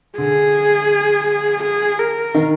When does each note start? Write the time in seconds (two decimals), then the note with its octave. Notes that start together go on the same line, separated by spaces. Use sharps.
0.18 D3 G#4
1.62 G#4
1.99 A#4
2.35 D#3